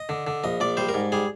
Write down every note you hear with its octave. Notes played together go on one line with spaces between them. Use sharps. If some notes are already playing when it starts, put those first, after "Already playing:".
Already playing: D#5
D3
D3
A#1 D#5
A#1 D5
G3 C5
A#4
G#2
G3 G#4